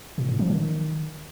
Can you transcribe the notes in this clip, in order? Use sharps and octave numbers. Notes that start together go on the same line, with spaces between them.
A#2
A2
F3
D#3